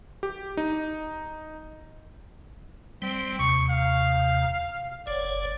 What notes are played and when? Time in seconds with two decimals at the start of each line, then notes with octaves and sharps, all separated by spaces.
0.23 G4
0.57 D#4
3.02 G3 C4
3.39 D#2 C3 C#6
3.70 F5
5.07 F#1 C#5 D5